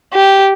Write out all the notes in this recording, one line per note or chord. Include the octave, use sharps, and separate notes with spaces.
G4